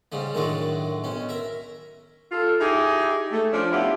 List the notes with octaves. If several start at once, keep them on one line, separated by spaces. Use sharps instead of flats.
G#2 C#3 G3
F#2 A2 D#3 F#3 G#3 D4
B1 C#4
A#4 E5
F4 A4
D#4 E4 G4 G#4
A3
F3 C#4 D4
B3 E4 F4 G4